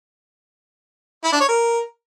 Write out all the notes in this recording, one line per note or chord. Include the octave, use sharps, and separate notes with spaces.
E4
D4
C#5
A#4